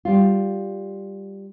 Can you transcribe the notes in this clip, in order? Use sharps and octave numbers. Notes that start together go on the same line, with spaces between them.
G3 F4